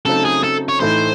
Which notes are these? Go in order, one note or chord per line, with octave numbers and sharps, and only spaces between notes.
C#3 F#3 A3 C4 D#4 A4
G#4
A4
C#5
A2 E3 A3 D#4 C5